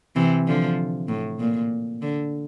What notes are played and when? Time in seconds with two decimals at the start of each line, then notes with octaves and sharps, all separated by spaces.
0.16 C3 E3
0.47 D3 F3
1.08 A2
1.39 A#2
2.02 D3